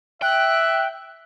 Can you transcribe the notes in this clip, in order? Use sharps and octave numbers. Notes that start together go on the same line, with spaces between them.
E5 G5 F#6